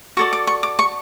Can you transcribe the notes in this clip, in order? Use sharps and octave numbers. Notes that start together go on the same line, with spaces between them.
F#4 A4 D5 C#6
D6
C#6
D6
C#6